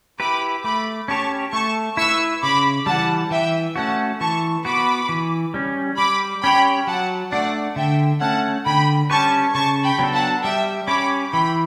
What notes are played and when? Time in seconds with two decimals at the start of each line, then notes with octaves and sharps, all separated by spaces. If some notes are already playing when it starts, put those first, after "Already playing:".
0.19 E4 G4 B4 B5 D6
0.64 A3 B5 D6
1.08 C#4 G4 C#5 A5 C#6
1.53 A3 A5 C#6
1.97 E4 B4 C#6 E6
2.43 C#3 B5 D6
2.86 E3 G3 F#5 A5
3.31 E3 E5 G5
3.76 A3 C#4 F#4 F#5 A5
4.20 E3 A5 C#6
4.65 B3 F#4 B5 D6
5.09 E3
5.54 G3 C#4
5.98 G3 B5 D6
6.43 C#4 G4 C#5 G5 B5
6.87 F#3 F#5 A5
7.32 A3 D4 D5 F#5
7.76 D3 E5 G5
8.21 A3 C#4 F#5 A5
8.66 D3 G5 B5
9.10 G3 C#4 G4 B4 A5 C#6
9.54 C#3 A5 C#6
9.84 G5 B5
9.99 F#3 B3 D4 A4
10.14 F#5 A5
10.43 G3 E5 G5
10.88 C#4 G4 C#5 B5 D6
11.32 E3 G5 B5